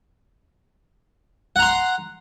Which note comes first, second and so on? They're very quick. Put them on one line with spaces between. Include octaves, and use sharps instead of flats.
F#5 A#5 C6